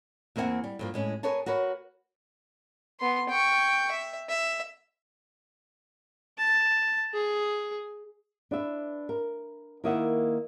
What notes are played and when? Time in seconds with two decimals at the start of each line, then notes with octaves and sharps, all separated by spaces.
0.36 E2 A#3 C4 E5 F#5 G#5
0.64 G3
0.79 G2 F3 A#3
0.94 A2 G#3 C#4
1.23 G#4 A#4 B4 C#5 G#5 A5
1.46 F#4 A#4 B4 C#5
3.00 B3 C6
3.29 G5 C#6
3.91 E5
4.29 E5
6.38 A5
7.14 G#4
8.51 D4 B4 E5
9.09 A#4
9.84 D#3 A#3 E4 D#5 E5 F#5